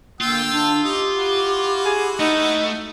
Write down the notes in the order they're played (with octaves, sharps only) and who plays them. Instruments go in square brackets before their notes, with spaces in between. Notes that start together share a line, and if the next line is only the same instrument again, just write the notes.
[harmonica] D3 G5 E6 [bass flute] A#3 [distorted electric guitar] F4
[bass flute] D4
[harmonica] D#4 [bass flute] G4
[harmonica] E4 F#4
[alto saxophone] G#4
[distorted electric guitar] A3 [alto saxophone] D#4